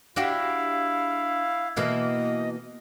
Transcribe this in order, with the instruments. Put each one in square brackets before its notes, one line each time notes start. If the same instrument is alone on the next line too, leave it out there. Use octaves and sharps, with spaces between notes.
[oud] D4 F#4 G4 [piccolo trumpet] E4 [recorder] F5
[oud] B2 E3 A#3 [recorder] D#5